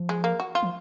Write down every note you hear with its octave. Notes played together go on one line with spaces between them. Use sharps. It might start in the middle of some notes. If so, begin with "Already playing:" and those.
Already playing: F3
G#3
A#3
F#4
F4
F3